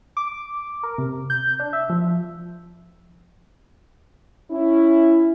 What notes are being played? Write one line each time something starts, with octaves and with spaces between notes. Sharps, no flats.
D6
A#4
C3
G6
D4
E5
F3
C#4 E4